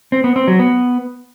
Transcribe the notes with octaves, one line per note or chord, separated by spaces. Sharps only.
C4
B3
C4
F#3
B3